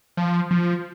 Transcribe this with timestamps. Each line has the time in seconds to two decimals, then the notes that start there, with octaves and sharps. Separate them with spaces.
0.17 F3
0.51 F3